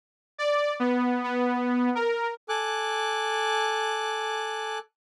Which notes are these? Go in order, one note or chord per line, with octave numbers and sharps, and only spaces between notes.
D5
B3
B3
A#4
A4 G#5 D6 F#6